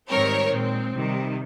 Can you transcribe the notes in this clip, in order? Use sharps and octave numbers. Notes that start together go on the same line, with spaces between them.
G#2 D#3 G3 C4 A#4 C#5
A#2 G#3 C4
C3 D#3 G3